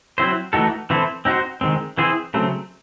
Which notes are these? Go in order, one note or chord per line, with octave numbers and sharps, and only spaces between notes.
F#3 C4 E4 C5
E3 A3 D#4 F#4 A4
E3 C4 E4 A4 C5
C4 D#4 F#4 C5
D#3 G#3 C4
E3 C4 E4 G#4 C5
C#3 F#3 A3 C4